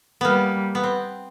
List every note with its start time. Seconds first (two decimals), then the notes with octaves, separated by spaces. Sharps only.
0.21 G3 A#3 B3
0.75 B3
0.83 C4